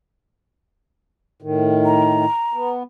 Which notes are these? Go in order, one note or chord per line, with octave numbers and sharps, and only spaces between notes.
A2 D#3
A#5
B3